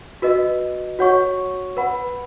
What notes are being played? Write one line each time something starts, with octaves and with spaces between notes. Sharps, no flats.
F#4 B4 D#5
F#4 C#5 F#5 C#6
B4 F#5 B5